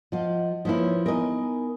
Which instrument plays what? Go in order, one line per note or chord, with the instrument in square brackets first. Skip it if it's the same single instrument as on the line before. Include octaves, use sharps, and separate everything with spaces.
[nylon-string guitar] F3 F4 [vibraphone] D#5 F#5
[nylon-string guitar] F3 A#3 E4 [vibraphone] D#4 B4 C#5
[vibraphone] B3 D#4 G#5 [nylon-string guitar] A#4 D#5